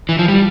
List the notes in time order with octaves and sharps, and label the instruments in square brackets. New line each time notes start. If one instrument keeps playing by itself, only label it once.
[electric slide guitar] E3
F3
G3